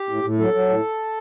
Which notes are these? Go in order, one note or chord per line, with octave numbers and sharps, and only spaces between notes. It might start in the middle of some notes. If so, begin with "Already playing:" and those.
Already playing: G4
A2
A2
F#3 A4
F#3
A2